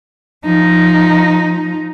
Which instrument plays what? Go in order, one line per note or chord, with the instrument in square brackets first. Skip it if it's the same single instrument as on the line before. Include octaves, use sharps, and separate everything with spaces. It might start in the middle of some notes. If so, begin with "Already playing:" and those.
[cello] F3 D#4